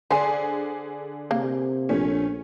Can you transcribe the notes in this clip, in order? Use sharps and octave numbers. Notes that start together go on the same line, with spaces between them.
D3 D4 G#4 C5 G#5
C3 A#3
A#1 A3 C#4